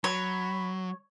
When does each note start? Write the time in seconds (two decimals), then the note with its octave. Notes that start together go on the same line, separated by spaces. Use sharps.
0.04 F#3 C#5 B5